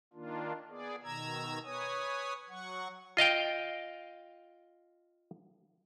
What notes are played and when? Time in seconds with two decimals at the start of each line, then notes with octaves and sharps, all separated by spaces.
0.14 D#3 A#3 D4 F4
0.69 B3 G#4 D5
1.03 B2 D#3 A#5 E6 G#6
1.65 B4 C#5 G#5 D#6
2.50 F#3 F#5 C#6
3.17 F4 D#5 F5 G5